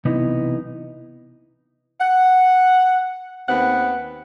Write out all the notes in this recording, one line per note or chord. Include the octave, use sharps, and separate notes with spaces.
B1 C3 E3 B3 D#4
F#5
D#2 B3 C4 F#5